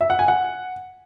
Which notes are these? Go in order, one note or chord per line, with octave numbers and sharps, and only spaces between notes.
E5
F#5
G#5
F#5